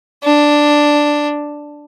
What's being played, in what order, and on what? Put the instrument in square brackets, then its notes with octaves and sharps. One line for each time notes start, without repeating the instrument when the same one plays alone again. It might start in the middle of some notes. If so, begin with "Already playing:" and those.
[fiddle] D4